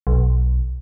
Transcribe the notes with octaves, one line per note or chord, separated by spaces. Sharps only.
B1